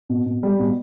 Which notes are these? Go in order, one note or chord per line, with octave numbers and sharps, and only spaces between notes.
B2
B2
G3
B2